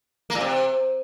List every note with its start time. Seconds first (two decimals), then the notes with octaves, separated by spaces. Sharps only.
0.30 A#3
0.35 A#2
0.41 C3